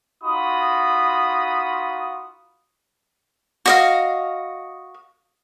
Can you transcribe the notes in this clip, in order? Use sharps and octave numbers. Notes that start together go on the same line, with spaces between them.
D#4 F4 F#4 B5 D#6
F#4 D#5 F5